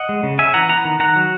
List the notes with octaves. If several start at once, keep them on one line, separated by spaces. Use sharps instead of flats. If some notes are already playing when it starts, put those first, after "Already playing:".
Already playing: D#5 F#5
G#3
C#3
C#4 E5 G#5
E3 F#5 A#5
B3 F#5 A#5
D#3
D#3 F#5 A#5
F#3